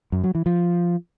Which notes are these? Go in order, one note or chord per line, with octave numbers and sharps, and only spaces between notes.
F#2
F#3
E3
F3